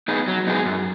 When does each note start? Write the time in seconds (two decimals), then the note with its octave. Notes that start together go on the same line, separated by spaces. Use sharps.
0.08 B3 D#4 G#4
0.28 F#3
0.47 B3 D#4 G#4
0.66 F#2